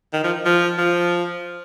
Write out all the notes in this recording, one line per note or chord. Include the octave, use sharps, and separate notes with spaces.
D#3
F3
F3
F3